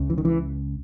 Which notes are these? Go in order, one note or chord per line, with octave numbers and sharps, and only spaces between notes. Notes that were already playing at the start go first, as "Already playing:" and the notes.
Already playing: C#2 C#3
E3
D#3
E3